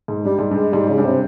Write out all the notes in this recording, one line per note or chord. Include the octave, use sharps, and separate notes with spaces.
G#2
G2 G3
G#2
G2
G#3
G#2 G3
C#3
G2
C3